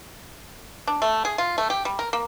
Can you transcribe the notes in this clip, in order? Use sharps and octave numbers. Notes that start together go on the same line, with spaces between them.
D4
A3
G#4
F4
A3
G4
G3
A#4
A#3